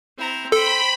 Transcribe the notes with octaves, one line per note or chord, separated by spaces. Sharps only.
C4 E4 A#5
A4 C5 G5 B5